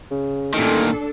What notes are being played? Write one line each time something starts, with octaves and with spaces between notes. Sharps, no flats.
C#3
A1 A#2 D#3 D4 A4